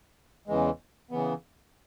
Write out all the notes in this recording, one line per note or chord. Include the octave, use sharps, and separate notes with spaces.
E2 C#3 E3 G#3
C#3 E3 B3